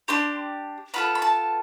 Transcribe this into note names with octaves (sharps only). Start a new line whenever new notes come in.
D4 G4 C6
B3 F4 A4 B5
B5
A5